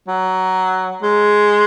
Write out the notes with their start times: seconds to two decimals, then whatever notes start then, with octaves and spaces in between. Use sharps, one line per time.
0.08 F#3
1.02 G#3